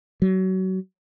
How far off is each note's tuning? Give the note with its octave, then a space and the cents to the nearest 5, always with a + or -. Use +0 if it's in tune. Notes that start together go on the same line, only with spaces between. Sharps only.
F#3 +25